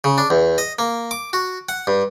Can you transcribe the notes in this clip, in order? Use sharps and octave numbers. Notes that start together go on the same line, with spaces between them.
C#3
D4
E2
D#5
A#3
D6
F#4
F#5
G2